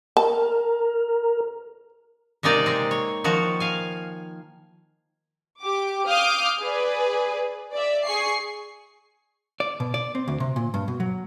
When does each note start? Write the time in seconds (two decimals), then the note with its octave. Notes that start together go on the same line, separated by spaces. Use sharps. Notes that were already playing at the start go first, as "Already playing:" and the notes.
0.17 A#4 A5
2.43 C3 G#3 A#3 D#4 D5
2.66 G#3 C4
2.91 C#5
3.24 D#3 F3 F#4
3.60 F5 G#5
5.59 G4 D6
6.07 F5 D6 D#6 F6 G6
6.60 G#4 B4 D5
7.72 D5 E5
8.04 G#4 C#6 C7
9.60 D5
9.80 B2
9.94 D5
10.15 C4
10.28 D2
10.40 C3
10.56 A#2
10.74 G2
10.88 B2
11.00 F#3